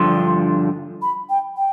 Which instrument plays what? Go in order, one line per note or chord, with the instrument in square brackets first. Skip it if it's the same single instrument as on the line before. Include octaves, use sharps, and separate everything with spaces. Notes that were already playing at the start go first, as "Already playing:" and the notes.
Already playing: [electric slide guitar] G2 D3 F3 [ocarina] C6
[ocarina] B5
G5
G5